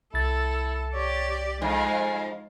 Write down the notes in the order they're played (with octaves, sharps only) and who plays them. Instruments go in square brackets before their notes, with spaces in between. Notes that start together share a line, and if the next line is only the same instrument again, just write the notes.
[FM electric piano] C2 A6 [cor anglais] E4 [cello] A4
[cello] G4 D5 [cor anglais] C#5
[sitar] F2 G#2 [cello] G#3 F5 [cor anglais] G#5